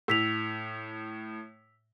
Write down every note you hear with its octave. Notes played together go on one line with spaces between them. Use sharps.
A2 E6 B6 F7